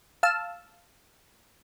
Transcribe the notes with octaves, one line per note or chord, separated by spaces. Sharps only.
F5 A5 E6